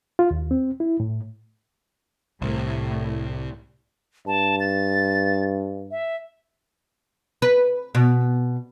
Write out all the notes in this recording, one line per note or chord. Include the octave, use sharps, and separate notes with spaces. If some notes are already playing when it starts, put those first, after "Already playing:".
F4
D#2
C4
E4
A2
C2 A2
G2 A5
A6
E5
B4
B2